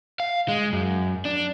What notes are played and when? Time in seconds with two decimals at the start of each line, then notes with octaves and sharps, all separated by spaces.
0.20 F5
0.48 G#3
0.73 F#2
1.25 D4